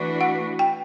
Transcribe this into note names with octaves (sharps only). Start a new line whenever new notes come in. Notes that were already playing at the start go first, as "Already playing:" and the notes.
Already playing: E3 A3 D4 F#4 B4
F#5
G5